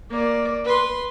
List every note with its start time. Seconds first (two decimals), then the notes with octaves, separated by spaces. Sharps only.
0.11 A#3 D5
0.65 B4 C6